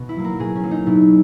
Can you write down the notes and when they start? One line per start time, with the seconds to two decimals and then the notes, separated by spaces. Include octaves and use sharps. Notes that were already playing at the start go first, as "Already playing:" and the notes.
Already playing: B2 B3
0.09 E4
0.16 F#3 A#3
0.24 A#4
0.40 B2 G#4
0.55 C#4
0.63 F#3 A#3
0.71 D#4
0.86 B2 E4